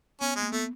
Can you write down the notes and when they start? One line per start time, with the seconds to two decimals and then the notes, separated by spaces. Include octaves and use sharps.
0.21 B3 C#4
0.36 G#3
0.42 A#3
0.52 A3 B3